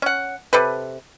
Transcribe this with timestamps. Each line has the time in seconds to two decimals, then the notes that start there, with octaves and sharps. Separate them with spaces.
0.02 C#4 F#5
0.53 C3 A4 B4